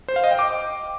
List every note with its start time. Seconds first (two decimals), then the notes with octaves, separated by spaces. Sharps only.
0.08 C5
0.16 F5
0.24 D#5
0.31 G5
0.39 D6